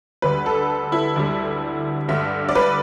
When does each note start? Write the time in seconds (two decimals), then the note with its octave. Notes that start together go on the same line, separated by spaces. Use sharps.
0.22 D2 D3 G3 B4
0.46 A4
0.92 E4
1.16 D2 D3 G3
2.08 G2 D3 G3 E5
2.49 D5
2.55 B4